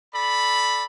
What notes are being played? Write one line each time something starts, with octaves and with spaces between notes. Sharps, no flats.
A4 D5 B5